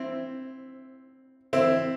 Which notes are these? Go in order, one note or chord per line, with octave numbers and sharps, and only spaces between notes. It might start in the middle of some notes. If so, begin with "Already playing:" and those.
Already playing: C4 E4
C4 E4